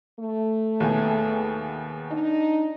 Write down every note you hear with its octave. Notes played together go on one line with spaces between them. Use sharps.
A3
D#2 B2 G#4
D4 D#4